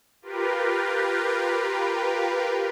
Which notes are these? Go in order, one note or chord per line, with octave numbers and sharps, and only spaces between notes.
F4 G4 A#4 B4